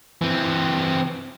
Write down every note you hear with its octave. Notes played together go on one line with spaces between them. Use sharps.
E3 C4